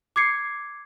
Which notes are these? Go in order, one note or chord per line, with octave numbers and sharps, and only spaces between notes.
D6 G#6 C7 C#7